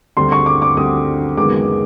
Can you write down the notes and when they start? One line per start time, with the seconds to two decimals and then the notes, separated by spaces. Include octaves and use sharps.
0.17 D2 D3 G3 C4 C6
0.32 C#6
0.46 D6
0.62 D6
0.76 D2 D3 G3 C4 D#6
1.37 F#1 F#2 D#3 G#3 B3 D6